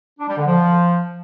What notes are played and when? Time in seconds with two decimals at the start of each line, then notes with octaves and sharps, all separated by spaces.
0.19 D4
0.28 G3
0.38 D3
0.47 F3